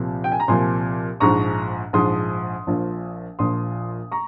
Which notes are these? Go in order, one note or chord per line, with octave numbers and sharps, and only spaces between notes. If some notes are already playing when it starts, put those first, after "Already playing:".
Already playing: C2 A#2 F3
G5
G#5
A#5
C2 A#2 F3 G#5 C6
A#1 G#2 F3 A#5 C#6
A#1 G#2 F3 C6 D#6
A#1 A#2 F3
A#1 A#2 F3 C6 D#6
A#5 C#6